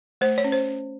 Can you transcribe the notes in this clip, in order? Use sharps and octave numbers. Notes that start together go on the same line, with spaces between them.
A3 C5
C#5
C#4
C5
C#4